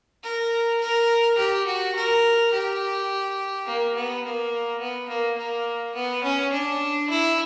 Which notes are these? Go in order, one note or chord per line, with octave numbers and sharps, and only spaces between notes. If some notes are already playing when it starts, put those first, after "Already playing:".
A#4
A#4
G4
F#4
A#4
G4
A#3
B3
A#3
B3
A#3
A#3
B3
C#4
D4
E4